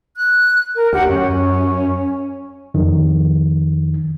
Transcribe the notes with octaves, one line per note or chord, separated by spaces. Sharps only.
F#6
A#4
D2 G4 F#5
F#2 C#4
F2 D#3